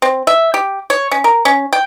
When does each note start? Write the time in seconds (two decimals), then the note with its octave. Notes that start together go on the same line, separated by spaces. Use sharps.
0.02 C4
0.27 E5
0.54 G4
0.90 C#5
1.11 C#4
1.24 A#4
1.45 C#4
1.73 G5